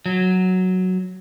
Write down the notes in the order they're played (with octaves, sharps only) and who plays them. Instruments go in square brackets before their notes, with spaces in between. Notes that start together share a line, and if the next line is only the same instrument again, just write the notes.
[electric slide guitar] F#3